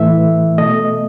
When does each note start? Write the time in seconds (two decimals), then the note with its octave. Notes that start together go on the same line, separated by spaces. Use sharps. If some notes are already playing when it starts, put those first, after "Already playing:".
Already playing: A2 E3 A3 E5
0.58 B2 A3 D#5